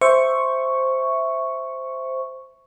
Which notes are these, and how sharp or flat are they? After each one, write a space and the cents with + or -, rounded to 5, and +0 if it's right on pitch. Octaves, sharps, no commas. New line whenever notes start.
C5 +0 E5 +0 C#6 +0